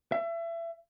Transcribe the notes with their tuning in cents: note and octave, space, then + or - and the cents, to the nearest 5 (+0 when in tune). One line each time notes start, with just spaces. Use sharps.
E5 +30